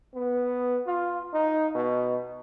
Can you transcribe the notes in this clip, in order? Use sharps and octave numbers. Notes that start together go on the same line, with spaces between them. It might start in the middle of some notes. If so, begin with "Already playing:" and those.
B3
F4
D#4
B2